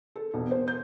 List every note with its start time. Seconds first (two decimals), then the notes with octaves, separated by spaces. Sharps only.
0.16 A4
0.34 E1
0.51 C5
0.68 G6